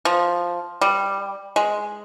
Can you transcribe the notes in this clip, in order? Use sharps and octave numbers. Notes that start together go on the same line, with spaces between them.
F3
G3
G#3